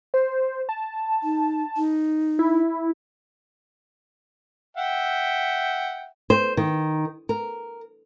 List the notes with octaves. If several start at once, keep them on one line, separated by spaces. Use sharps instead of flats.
C5
A5
D#4
D#4
E4
E5 F#5 G5
C5
D#3
A#4